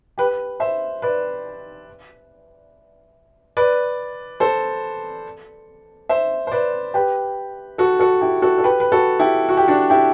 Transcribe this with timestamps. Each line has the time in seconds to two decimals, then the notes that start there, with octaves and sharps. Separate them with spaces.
0.18 G4 B4
0.60 C5 E5
1.02 B4 D5
3.57 B4 D5
4.40 A4 C5
6.09 C5 E5
6.47 C5
6.52 B4 D5
6.94 G4 B4
7.78 F#4 A4
8.00 F#4 A4
8.21 E4 G4
8.42 F#4 A4
8.58 A4
8.64 G4 B4
8.80 B4
8.92 F#4 A4
9.20 E4 G4
9.49 F#4
9.57 G4
9.68 D4 F#4
9.90 E4 G4